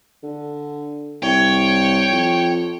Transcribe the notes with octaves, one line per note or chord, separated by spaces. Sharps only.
D3
C2 C#5 G5
F2